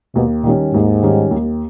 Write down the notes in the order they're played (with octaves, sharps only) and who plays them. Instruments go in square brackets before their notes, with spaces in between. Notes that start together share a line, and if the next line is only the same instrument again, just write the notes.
[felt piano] D#2 [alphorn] B2
[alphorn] A#2 [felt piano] D#3 G3 C#4
[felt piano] D#2 [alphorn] G#2
[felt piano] D#3 G3 C#4
D#2